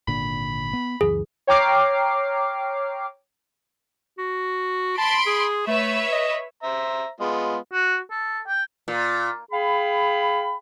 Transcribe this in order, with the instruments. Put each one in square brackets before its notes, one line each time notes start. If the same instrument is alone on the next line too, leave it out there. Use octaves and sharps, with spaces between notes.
[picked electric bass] G#1 A#2 D3 [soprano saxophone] B5
[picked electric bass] B3
[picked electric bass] C#2 F#2 E3 [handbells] G#4
[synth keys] C#5 G5 A#5 D6 F6 C7
[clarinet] F#4
[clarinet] A5 [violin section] B5 C6 D7
[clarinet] G#4
[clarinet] A3 [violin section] B4 C#5 E5
[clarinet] D#5
[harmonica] C5 E5 A#5
G#3 B3 F4
[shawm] F#4
A4
G5
[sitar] A#2
[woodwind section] G#4 F5 G5 B5